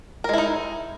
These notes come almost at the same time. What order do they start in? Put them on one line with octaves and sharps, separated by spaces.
A#4 G#3 E4 D#4